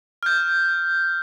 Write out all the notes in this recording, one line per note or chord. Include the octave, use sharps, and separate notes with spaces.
F6 G6